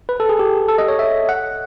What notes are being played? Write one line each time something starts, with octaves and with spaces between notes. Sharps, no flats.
B4
A4
G#4
G4
A4
D#5
C#5
E5
F#5